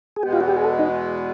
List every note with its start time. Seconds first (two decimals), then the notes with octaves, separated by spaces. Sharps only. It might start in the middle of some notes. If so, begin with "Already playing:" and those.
0.16 G#4
0.23 E2 B2 G#3 B3 G4
0.33 F4
0.41 F#4
0.48 G4
0.57 G#4
0.64 A4
0.79 D#4